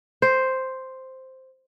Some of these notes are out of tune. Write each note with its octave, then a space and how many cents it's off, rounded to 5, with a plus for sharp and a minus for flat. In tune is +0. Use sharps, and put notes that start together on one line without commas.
C5 +0